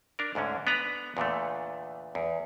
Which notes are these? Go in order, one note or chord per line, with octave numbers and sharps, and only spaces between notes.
D4 A#4
D2 G#2 D3 C#4
B3 D4 B4 A#5
E2 A#2 D3 A3
E2